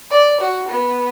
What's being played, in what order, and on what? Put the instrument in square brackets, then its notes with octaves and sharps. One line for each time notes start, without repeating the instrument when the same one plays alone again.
[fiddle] D5
F#4
B3